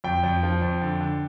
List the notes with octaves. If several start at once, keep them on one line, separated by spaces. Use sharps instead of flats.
F2 G5
F2
F3
F2
D3
D3